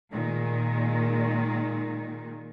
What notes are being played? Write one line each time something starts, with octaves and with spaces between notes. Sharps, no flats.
A#2 D#3 G#3